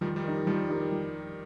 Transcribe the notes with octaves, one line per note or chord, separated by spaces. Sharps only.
D#3 F3 G3
D#3 G3
D#4 G4 A#4
D#3 F3 G3
D#4 G4 A#4
F3